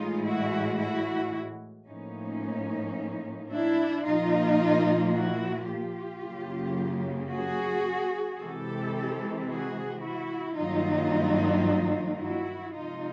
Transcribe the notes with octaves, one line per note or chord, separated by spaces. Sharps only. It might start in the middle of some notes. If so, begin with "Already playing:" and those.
Already playing: A2 E3 G#3 D#4 F4
E4 F#4
E4 F#4
A2 F3 A#3 C#4 D#4
D4 E4
A#2 F3 A#3 D#4 F4
E4 F#4
F4 G4
F#2 C#3 F#3 A#3
F#4 G#4
C3 E3 G#3 G4 A4
F#4 G#4
E4 F#4
G2 D#3 F#3 A#3 D#4 F4
E4 F#4
C3 F3 G#3 D#4 F4